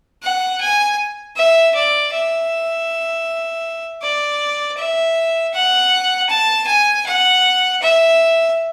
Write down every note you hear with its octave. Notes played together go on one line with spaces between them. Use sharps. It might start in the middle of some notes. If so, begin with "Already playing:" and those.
F#5
G#5
E5
D5
E5
D5
E5
F#5
A5
G#5
F#5
E5